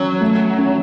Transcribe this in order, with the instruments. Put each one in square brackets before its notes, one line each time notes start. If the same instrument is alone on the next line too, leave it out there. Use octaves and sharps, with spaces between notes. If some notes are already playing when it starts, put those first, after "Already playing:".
Already playing: [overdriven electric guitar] F#3 [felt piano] C#4
[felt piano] A3
C#4